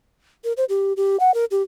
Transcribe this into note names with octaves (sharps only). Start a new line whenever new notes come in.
A#4
C5
G4
G4
F#5
A#4
G4